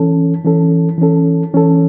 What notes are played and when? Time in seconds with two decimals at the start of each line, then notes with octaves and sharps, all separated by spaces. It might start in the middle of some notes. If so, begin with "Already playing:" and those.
Already playing: E3 C#4 A4
0.44 E3 C#4 A4
0.98 E3 C#4 A4
1.54 E3 C#4 A4